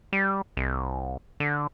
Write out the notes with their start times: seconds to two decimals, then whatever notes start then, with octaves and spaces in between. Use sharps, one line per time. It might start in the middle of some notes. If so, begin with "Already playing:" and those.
0.13 G3
0.57 C2
1.40 D3